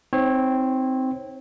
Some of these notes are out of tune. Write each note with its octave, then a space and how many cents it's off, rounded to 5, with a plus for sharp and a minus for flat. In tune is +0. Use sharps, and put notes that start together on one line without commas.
C4 -5 D#4 +15 C#5 -30